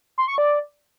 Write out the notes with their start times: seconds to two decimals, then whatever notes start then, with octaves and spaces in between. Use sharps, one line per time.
0.18 C6
0.28 C#6
0.38 D5